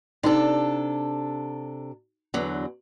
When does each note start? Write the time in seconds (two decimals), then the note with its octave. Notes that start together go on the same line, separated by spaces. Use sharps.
0.23 C3 D4 D#4 A4 D5
2.34 E2 D3 F#3